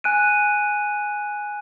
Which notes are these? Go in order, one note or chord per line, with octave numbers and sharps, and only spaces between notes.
G#5 F#6 D7 D#7